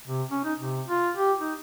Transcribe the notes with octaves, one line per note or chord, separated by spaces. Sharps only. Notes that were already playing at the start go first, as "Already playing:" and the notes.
C3
C#4
D#4
C3
F4
G4
D#4